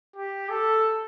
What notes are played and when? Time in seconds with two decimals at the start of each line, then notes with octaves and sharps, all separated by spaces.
0.16 G4
0.50 A4